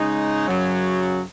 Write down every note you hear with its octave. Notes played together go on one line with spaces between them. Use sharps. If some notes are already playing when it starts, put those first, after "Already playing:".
Already playing: C#3 G#3 D#4
F#2 C#3 F#3